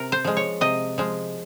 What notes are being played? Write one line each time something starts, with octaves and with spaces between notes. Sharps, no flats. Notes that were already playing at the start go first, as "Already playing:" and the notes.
Already playing: C3 A#4
C5
F3 G#3
C#5
C3 D#5
F3 G#3